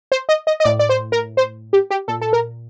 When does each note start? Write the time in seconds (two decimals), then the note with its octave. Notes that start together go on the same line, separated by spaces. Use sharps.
0.12 C5
0.29 D#5
0.47 D#5
0.60 D#5
0.64 A2 D5
0.79 D5
0.89 C5
1.12 A#4
1.37 C5
1.73 G4
1.90 G4
2.08 A#2 A4
2.21 A4
2.33 A#4